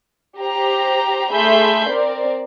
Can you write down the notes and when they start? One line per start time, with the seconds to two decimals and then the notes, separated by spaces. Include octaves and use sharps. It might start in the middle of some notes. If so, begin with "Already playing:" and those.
0.40 G4 C5 A#5
1.31 A3 G#4 E5 B5 C6 G6
1.89 C4 A#4 D5